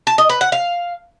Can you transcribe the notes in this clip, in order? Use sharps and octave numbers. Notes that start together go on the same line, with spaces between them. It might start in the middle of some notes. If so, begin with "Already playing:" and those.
A5
D#5
B4
F#5
F5